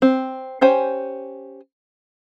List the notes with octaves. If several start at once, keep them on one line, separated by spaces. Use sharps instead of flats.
C4
C#4 G4 C5 G#5